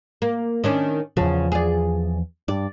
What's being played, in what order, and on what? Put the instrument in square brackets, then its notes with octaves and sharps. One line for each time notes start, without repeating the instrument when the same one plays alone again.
[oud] A#3
D#3 C#4 D4
[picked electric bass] E2 F3 [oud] C#3
[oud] G#4 D5
[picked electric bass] G2 [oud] D5